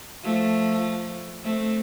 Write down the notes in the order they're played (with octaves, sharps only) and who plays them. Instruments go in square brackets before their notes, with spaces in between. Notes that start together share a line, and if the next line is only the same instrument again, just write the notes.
[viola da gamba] F3 A3
A3 C4